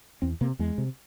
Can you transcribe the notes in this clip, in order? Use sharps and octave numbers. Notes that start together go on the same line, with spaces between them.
E2 C4
C3 A#3
E2 G#3
C3